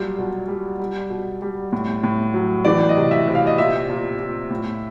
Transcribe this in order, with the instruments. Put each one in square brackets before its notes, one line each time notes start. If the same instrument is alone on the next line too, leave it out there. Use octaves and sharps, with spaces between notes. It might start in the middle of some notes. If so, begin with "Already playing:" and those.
Already playing: [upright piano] A#2 F#3 G3
B2
G3
G3
B2
G3
A2
A2
F#3
E3 D5
D#5
C3
E5
C3
F5
D#5
A#2 E5
A#2
A#2
A2